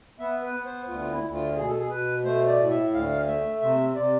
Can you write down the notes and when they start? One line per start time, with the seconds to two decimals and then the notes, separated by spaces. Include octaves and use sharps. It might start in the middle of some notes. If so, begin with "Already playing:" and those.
0.20 B3 E5
0.42 B4
0.54 B3
0.65 C5
0.88 D2 F4
1.01 F4
1.11 E4
1.23 D2
1.34 F4
1.56 B2 G#4
1.68 A4
1.78 G#4
1.90 B2 B4
2.24 A3 C5
2.48 D5
2.59 A2
2.71 E5
2.93 D2 F5
3.28 A3 E5
3.62 C3 E5
3.96 C3 D5